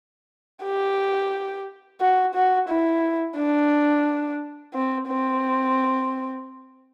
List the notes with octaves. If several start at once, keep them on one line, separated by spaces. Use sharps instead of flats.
G4
F#4
F#4
E4
D4
C4
C4